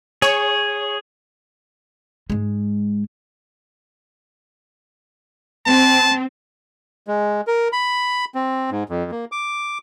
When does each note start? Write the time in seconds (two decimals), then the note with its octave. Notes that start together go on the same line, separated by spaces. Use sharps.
0.22 G#4 C#5
2.30 G#2 G#3
5.66 C4 A5
7.07 G#3
7.47 A#4
7.72 B5
8.35 C4
8.71 G#2
8.90 F2
9.11 A#3
9.32 D6